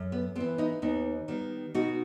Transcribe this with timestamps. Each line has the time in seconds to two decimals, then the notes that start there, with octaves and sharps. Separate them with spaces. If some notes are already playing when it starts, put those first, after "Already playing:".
Already playing: F#2
0.12 B3
0.36 B3 C4
0.40 E3
0.58 B3 D#4
0.82 D#2 B3 D#4
1.28 D#3 G3 B3
1.75 B2 D#4 F#4